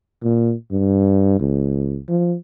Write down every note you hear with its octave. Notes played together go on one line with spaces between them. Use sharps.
A#2
G2
C#2
F3